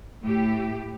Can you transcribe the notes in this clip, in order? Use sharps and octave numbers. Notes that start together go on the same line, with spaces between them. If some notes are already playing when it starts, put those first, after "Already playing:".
A2 G4